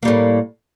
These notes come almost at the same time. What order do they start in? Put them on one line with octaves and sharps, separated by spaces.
A#3 G3 A2